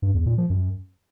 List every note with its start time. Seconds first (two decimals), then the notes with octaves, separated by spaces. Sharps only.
0.02 G2
0.14 E2
0.26 A#2
0.38 F3
0.50 F#2